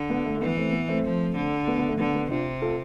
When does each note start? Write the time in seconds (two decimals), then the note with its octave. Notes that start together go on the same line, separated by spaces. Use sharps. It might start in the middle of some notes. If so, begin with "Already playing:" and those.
Already playing: D3
0.10 B3
0.25 A3
0.36 A3
0.41 E3 B3
0.57 A3 C4
0.72 B3
0.89 A3 C4
1.04 F3
1.36 D3
1.67 B3
1.78 B3
1.88 A3
1.99 D3 B3
2.15 B3
2.30 C3 D4 F4
2.62 F4 A4